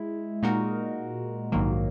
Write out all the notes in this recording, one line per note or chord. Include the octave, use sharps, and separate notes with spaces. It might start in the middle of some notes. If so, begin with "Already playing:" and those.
Already playing: G#3 E4
A#2 G#3 D#4 F#4 A#4
A#1 G#2 D#3 F#3 A#3